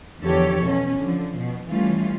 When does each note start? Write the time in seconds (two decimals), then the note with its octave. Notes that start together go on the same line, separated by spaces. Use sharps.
0.22 E2 D3 F3 G4 A4 C#5
0.64 B2 C#4
0.98 D3 F3
1.38 B2
1.69 E3 G3 A3 C#4 F4